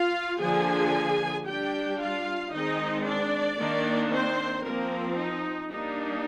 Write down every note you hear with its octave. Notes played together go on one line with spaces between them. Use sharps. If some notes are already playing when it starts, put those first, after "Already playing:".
Already playing: F4 F5
D3 F3 A#3 D4 G#4 G#5
G3 D4 G4 G5
F4 F5
D#3 G#3 C4 D#4 D#5
D4 D5
D#3 A#3 D4
C4 C5
F3 A#3 C4 A#4
D#4
G3 A#3 D4 D#4